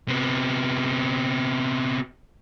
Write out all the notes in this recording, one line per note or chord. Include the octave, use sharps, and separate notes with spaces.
C3 B3